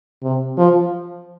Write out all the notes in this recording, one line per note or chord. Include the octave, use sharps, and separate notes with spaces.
C3
F3